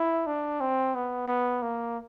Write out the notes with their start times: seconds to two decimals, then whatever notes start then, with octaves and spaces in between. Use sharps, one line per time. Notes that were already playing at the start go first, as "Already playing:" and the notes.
Already playing: E4
0.26 D4
0.61 C4
0.95 B3
1.28 B3
1.62 A#3